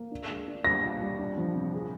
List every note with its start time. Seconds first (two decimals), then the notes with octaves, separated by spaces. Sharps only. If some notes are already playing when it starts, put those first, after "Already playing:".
Already playing: A#3
0.11 D4
0.30 G#3
0.47 D4
0.65 G3 A#6
0.83 F4
1.01 G3
1.19 D4
1.37 F3
1.55 C3
1.73 G#4